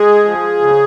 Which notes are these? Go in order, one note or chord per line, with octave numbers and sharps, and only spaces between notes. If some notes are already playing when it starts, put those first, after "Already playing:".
Already playing: G#3 G#4
F3
C#3